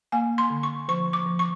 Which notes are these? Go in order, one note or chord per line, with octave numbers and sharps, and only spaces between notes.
A#3 G#5
C6
D3
C#6
F3 C#6
D6
F3
C#6